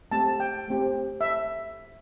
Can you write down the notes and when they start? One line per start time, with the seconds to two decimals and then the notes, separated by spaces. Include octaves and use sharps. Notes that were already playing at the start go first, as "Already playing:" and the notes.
0.11 A3 C4 G4 A5
0.40 G5
0.68 A3 C4 G4
1.21 E5